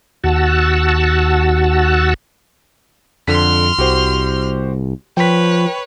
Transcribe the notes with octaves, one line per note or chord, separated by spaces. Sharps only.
D#2 F#4 F#5 A5 E6
F2 D3 C6 F6 B6
C2 F#4 G4 C5
F3 B4 C#5 G5 B6